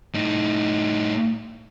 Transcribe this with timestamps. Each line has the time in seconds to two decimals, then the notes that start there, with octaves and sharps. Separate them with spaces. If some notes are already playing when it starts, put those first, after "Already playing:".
0.14 A2 D#4